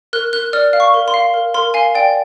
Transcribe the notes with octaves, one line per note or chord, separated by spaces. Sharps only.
A#4 F#6
A#4 F#6
D5 F6
F5
C#6
A#4
C6
F5
A#4
A#4 C6
F5 G#5
D5 G5